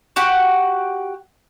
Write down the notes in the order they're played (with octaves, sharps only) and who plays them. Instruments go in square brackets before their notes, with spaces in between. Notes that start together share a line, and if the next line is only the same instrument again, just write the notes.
[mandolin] F#4 G4 F#5